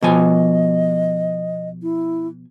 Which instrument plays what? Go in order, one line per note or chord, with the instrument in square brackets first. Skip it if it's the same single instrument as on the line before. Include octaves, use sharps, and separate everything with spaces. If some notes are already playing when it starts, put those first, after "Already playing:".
[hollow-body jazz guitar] B2 F3 G#5 [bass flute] D#5
[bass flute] E4